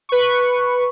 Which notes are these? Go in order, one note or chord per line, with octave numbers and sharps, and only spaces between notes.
B4 C#6